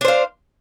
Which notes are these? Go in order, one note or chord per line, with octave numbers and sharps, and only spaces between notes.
D4 C5 F5